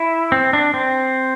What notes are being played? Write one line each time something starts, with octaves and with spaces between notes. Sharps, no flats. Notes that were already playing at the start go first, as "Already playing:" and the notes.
Already playing: E4
C4
D4
C4